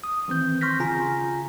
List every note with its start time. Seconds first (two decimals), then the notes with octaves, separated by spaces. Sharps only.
0.04 D#6
0.28 D#3 E3 C4 G6
0.61 C6 C#6 F6 G6 A#6 B6
0.80 C#3 F4 G#5 A#5 A#6